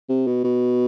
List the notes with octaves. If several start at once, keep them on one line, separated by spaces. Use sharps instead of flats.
C3
B2
B2